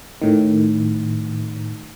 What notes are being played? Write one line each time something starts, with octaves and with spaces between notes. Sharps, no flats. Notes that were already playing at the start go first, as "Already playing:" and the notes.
A2 D#3